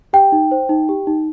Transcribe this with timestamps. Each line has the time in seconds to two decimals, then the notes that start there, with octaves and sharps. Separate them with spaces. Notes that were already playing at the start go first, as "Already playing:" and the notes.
0.13 G4 G5
0.32 D#4
0.51 C5
0.69 D#4
0.89 G4
1.07 D#4